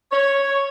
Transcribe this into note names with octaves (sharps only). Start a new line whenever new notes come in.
C#5